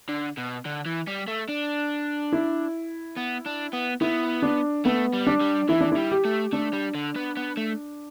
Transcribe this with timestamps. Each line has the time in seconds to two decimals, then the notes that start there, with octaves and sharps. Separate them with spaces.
0.09 D3
0.37 B2
0.65 D3
0.86 E3
1.08 G3
1.28 A3
1.49 D4
2.32 E4
3.17 B3
3.46 D4
3.73 B3
4.01 B3 E4
4.42 D4
4.85 A3 B3
5.13 G3
5.27 D4
5.41 G3
5.69 E3 E4
5.80 D4
5.92 E4
5.97 G3
6.11 G4
6.25 A3
6.53 A3 D4
6.73 G3
6.95 D3
7.16 B3
7.37 B3
7.57 A3